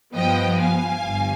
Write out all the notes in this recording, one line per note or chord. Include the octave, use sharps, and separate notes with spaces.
G2 F3 B3 D#5 G5
F5 G#5
G1 G2